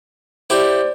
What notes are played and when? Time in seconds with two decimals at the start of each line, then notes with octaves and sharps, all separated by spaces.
0.50 E4 G4 C5 D5